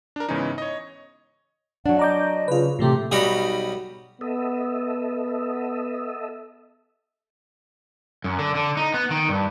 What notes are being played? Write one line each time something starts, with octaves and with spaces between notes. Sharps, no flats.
D4 A#4
G#2 C#3 E3 B3 C#4 D#4
C#5 D#5
F#3 D4 F#5
D#5 A#5 D6 G6
C#3 F4 B4
A2 C3 E3 A3 G4
B1 G3 D#4 F#4 G4 B5
B3 A4 D#5 E5
F#2
D3
D3
D#4
B3
D#3
G2